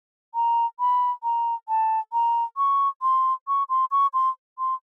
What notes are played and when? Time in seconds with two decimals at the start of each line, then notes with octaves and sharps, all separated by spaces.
0.35 A#5
0.80 B5
1.23 A#5
1.69 A5
2.13 A#5
2.57 C#6
3.02 C6
3.48 C#6
3.69 C6
3.91 C#6
4.14 C6
4.59 C6